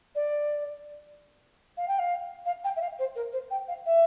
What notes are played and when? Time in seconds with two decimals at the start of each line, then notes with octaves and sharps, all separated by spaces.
0.15 D5
1.77 F5
1.88 G5
1.99 F5
2.46 F5
2.64 G5
2.76 E5
2.81 F5
2.99 C5
3.15 A#4
3.32 C5
3.51 G5
3.68 F5
3.86 E5